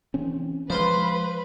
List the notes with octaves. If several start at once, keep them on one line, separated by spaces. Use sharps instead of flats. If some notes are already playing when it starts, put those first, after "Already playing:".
E3 C4 C#4
F3 G#3 B4 C5 F5 C6